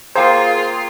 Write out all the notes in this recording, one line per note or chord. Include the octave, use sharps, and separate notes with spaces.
A#3 F4 G#4 C5 F5 G5 A#5